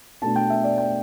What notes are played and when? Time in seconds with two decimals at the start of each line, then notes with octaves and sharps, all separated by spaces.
0.22 B2 A3 D4 A5
0.36 G5
0.50 E5
0.64 D5
0.78 G5